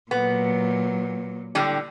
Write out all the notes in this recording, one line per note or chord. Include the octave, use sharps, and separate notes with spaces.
A#2 F#3 B3
A2 D3 G3